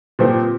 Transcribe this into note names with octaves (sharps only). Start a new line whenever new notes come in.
A#2 F3 C4 G4 C5